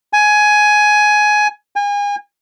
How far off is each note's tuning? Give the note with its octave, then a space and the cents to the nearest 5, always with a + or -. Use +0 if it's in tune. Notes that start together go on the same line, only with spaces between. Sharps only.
G#5 +15
G#5 -35